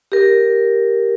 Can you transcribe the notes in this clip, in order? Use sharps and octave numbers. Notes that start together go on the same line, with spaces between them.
G4 A#4